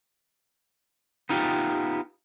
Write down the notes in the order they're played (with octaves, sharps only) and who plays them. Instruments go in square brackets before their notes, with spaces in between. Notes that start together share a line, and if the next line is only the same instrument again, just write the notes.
[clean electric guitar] B3 D#4 F4 G4